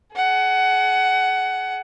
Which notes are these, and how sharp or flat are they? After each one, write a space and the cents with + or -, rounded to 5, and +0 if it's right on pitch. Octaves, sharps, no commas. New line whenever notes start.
G#4 +35 F#5 +20